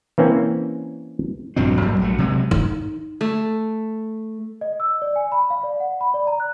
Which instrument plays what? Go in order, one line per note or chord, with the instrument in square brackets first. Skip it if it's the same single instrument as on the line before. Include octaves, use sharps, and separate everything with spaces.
[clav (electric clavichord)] E3 A#3 C4 C#4
[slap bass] A#1 G2 F#3 C4
A2 F#3 G3 A#3
A#1 F#3 A3
C3 F#3 G#3
[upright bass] D#4
[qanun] A3
[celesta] D#5
E6
D5
G#5
B5
F5
D5
F#5
B5
D5
A#5
F#6